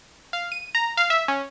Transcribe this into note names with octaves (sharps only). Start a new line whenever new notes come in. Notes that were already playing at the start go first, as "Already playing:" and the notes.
F5
D#7
A#5
F5
E5
C#4